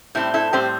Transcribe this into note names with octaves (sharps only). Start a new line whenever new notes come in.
A2 G3 C4 E4
E4 A4
A2 G3 C4 G4 C5